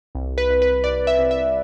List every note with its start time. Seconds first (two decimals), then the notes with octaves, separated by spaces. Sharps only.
0.15 C2
0.38 B4
0.50 C2
0.62 B4
0.84 C2 D5
1.07 E5
1.19 C2
1.31 E5